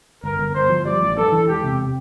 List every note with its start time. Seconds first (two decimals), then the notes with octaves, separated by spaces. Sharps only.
0.24 G1 A#4
0.39 G1
0.54 G1 C5
0.70 F3
0.85 G3 D5
1.01 A1
1.17 G2 A4
1.32 E3
1.48 E1 G4
1.64 C3